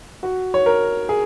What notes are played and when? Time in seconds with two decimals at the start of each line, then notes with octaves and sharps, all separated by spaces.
0.23 F#4
0.54 C#5
0.66 A#4
1.09 G#4